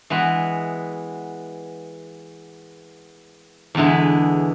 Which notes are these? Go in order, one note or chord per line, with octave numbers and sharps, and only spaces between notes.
E3 G#3 B3 F#4
E2 D3 G#3 B3 E4